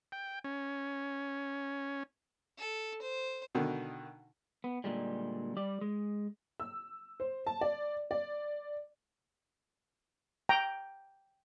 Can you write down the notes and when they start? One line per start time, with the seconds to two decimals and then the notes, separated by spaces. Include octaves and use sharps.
0.12 G5
0.44 C#4
2.58 A4
3.01 C5
3.55 B2 D3 D#3
4.64 B3
4.84 A#2 D3 G3 G#3
5.57 G3 D5
5.81 G#3
6.60 E6
7.20 C5
7.47 A5
7.61 D5
8.11 D5
10.49 G5 A#5